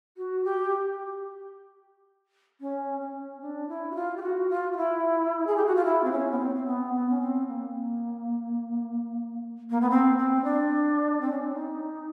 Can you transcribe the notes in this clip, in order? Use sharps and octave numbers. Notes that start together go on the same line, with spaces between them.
F#4
G4
C#4
C#4
D4
E4
F#4
F4
G4
F#4
F4
F4
E4
G#4
G4
F#4
F4
E4
C4
C#4
B3
C4
C4
B3
B3
C#4
C4
A#3
A#3
B3
C4
C4
D4
C4
C#4
D4
D#4